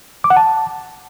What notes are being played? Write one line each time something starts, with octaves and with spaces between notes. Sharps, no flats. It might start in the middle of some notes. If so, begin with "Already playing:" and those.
D6
F#5
A5